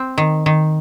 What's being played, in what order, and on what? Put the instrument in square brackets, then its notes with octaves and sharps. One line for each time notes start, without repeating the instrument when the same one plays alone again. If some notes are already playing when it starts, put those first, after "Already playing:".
Already playing: [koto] C4
D#3
D#3